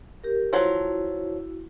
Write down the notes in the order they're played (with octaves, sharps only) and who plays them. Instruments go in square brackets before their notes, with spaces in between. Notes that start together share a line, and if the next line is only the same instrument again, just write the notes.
[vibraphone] G4 A#4
[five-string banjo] F3 F#3 [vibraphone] E4 F#4